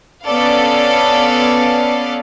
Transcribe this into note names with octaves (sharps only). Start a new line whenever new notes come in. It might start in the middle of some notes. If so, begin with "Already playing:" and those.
B3 C#4 A4 B4 D5 F5